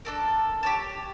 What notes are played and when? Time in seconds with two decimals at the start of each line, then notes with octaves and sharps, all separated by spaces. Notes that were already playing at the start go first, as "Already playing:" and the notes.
0.05 D4 A4 A#4
0.63 G4 C#5 A5